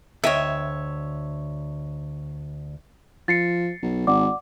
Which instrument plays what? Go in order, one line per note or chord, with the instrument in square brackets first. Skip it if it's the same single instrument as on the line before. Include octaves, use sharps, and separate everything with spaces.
[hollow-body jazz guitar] D2 D#5 G5 [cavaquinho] C#5 E5
[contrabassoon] F3 [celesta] A6 C7 C#7
[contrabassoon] B1
[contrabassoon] G#1 [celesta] D5 F#5 D6